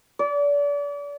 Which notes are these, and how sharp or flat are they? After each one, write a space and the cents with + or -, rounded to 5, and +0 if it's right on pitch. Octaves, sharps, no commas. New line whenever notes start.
D5 -35